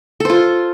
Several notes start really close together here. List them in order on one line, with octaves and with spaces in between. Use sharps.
A4 C5 F4